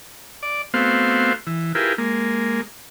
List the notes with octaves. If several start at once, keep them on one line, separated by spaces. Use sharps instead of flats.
D5
A3 B3 C4 F#4 C5 F5
E3
E4 F4 G4 G#4 A#4 B4
G#3 A#3